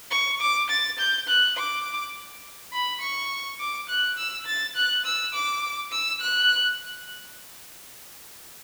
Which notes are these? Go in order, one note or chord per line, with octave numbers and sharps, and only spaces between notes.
C#6
D6
A6
G6
F#6
D6
B5
C#6
D6
F#6
E6
A6
F#6
E6
D6
E6
F#6